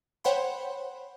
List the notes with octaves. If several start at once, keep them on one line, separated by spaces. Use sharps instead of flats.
C5 C#5 F#5 G5 B5 C6